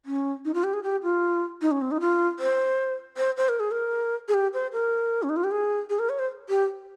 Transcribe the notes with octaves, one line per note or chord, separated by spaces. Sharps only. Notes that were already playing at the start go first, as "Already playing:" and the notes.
C#4
D#4
F4
G4
G#4
G4
F4
D#4
C#4
C4
D#4
F4
C5
C5
C5
A#4
G#4
A#4
G#4
G4
C5
A#4
C#4
D#4
F4
G4
G#4
G#4
A#4
C#5
C5
G4